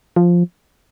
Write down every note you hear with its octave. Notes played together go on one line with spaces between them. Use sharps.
F3